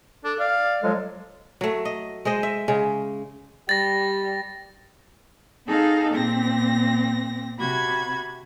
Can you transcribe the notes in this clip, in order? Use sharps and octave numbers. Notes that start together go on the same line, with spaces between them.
D4 A4
D5 F5
F3 F#3 G#3 A4
F#3 A3
D#5
G#3 C5 D#5
E5
C#3 G#3
G3 A6 A#6
C4 D#4 G#4 A4 F5
A#2 C4 A#6
C3 F#4 B5 G#6